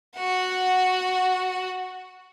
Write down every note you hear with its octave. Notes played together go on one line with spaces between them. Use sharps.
F#4 F#5